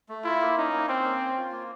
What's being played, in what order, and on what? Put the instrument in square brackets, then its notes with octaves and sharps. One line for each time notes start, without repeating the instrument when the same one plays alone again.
[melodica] A3
[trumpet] E4 [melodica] F4
[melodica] A#3
[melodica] C#4 [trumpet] D#4
[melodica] A#3
[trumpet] C4 [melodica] C#4
[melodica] A#3
C#4
F4
A#3